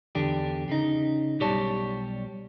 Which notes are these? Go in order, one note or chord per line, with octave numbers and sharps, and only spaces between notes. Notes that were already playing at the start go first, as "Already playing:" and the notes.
E2 D3 D4 G4
C#3 D#4
B1 G3 G4 C#5 D5 A5